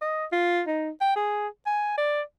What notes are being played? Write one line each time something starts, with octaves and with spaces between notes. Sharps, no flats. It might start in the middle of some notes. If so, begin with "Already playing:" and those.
D#5
F4
D#4
G5
G#4
G#5
D5